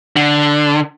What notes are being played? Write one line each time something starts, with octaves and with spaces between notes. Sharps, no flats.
D3